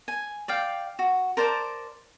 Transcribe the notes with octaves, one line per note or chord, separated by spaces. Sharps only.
G#5
D5 F5 G5
F#4
A#4 C5 D5 A5